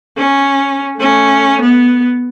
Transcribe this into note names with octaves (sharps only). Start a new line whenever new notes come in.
C#4
A3 C#4
B3